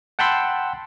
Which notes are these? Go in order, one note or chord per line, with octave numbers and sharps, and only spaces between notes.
F#5 G5 A5 B5 C6 E6